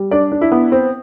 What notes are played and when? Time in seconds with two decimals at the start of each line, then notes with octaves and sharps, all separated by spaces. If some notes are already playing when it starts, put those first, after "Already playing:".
Already playing: G3
0.11 D4 D5
0.32 D4
0.41 E4
0.52 B3
0.72 C4